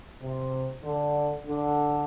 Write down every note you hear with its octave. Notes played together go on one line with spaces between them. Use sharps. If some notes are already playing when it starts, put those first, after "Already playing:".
C3
D3
D3